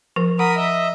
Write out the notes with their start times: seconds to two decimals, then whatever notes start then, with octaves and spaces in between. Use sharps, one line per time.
0.16 F3 A#4
0.39 A#4 F#5 B5 D#6
0.57 D#5 E5